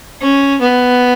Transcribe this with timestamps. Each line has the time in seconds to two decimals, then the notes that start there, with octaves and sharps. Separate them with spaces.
0.21 C#4
0.61 B3